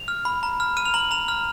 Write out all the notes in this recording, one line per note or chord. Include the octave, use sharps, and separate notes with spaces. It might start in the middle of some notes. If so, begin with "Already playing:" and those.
Already playing: F7
F6
B5
A#5
F6
F6 D#7
F7
A#5 F#7
A#5 F7
F6